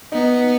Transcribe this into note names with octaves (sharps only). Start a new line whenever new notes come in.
B3 D#4